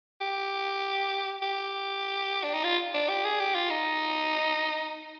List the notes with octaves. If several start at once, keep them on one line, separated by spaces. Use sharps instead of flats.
G4
G4
D4
D#4
F4
D4
G4
G#4
G4
F4
D#4